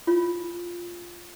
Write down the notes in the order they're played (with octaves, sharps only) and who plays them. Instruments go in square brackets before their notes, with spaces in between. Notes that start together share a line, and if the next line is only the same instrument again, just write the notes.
[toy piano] F4